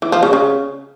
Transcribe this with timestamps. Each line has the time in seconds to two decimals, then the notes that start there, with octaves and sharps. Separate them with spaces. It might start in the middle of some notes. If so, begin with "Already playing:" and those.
0.02 E3
0.12 F3
0.23 C#3
0.33 C#3